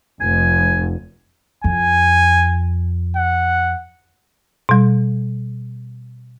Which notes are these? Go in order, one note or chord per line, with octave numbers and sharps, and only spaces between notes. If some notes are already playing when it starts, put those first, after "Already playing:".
F1 G#5
F2 G#5
F#5
B2 G3